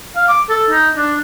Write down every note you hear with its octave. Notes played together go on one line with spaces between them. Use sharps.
F5
D6
A4
D#4
D4